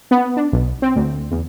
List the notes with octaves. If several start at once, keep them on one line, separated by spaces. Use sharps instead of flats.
B3
D4
B1
C4
D2
E2